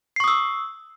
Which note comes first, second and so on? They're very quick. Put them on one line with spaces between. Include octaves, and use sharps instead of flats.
C7 C#6 D#6 E6